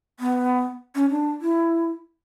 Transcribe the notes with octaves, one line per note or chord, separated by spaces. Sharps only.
B3
C#4
D4
E4